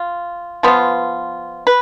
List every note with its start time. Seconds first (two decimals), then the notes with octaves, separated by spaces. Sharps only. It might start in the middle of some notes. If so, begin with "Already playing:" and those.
Already playing: F4
0.63 F3 B3 F4
1.67 B4